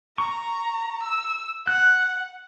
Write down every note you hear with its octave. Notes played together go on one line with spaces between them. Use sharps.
A#5 C#6
E6
F#5 F#6